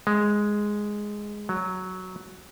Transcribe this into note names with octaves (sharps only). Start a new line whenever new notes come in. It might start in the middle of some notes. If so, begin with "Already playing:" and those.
G#3
F#3